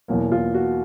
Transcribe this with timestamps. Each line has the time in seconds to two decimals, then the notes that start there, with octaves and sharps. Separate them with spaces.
0.08 E2 B2 F#3 A#3
0.32 F4
0.54 F#4